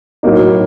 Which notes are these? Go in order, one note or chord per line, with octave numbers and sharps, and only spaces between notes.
B1 A2 F#3 A#3 D#4